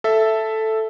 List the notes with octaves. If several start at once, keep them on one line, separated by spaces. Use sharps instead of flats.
A4 E5